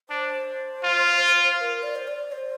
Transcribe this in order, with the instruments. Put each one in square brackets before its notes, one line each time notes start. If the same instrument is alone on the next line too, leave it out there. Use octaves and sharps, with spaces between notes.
[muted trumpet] D4 [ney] C5
[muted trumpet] F4
[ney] C5
A#4
D5
C5
D5
C5